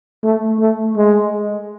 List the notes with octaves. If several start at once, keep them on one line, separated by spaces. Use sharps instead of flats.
A3
A3
G#3